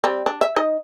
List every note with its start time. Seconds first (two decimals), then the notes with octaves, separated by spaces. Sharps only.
0.04 G3 C4
0.26 D4
0.41 E5
0.56 D#4 D#5